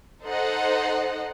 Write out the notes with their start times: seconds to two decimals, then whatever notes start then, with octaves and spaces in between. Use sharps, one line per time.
0.24 D#4 A4 C5 D#5 F#5